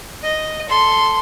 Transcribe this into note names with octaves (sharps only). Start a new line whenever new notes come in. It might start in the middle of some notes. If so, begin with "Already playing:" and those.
D#5
A4 C6